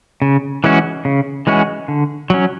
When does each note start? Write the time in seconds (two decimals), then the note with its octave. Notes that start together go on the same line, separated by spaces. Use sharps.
0.22 C#3
0.64 E3 G#3 C#4 F#4
1.05 C#3
1.47 E3 G#3 C#4 F#4
1.88 D3
2.30 F#3 C#4